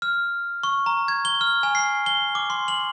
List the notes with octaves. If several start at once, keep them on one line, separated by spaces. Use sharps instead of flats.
F6
C#6
A#5
G#6
G7
F6
G#5
C7
G7
D6
C6
F#7